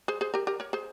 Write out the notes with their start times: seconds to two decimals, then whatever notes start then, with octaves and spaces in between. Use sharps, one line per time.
0.08 G#4 C5
0.21 G#4 C5
0.34 G4 A#4
0.47 G4 A#4
0.60 A#4 C#5
0.73 G#4 C5